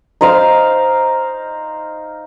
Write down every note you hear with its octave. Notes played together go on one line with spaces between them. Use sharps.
D#4 C5 F5